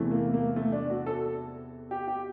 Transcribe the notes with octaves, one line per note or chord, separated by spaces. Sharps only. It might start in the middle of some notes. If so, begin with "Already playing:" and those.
Already playing: E2 C3 E3 A3
A#3
A#3
A3
D4
F#4
A4
G4
G4